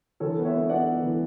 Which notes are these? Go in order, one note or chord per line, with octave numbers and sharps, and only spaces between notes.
E3 A4 C#5
B3
C#5 E5
B3
B3 D5 F#5
B3
E3